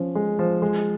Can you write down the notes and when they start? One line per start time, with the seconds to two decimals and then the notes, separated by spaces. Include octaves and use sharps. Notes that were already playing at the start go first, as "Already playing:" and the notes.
Already playing: F3 C#4
0.15 G#3
0.39 F3
0.62 G#3